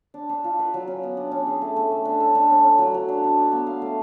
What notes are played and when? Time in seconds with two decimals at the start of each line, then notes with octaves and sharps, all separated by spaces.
0.14 D4
0.29 D4
0.44 F4
0.59 B4
0.74 F#3
0.88 C#4
1.03 B3
1.17 D4
1.32 C#4
1.47 G#4
1.62 A3
1.76 A3
1.91 A3
2.05 D4
2.20 A4
2.35 D4
2.50 C#4
2.64 C#4
2.78 F#3
2.94 F#3
3.09 D4
3.24 D4
3.37 D5
3.52 B3
3.67 F5
3.82 A3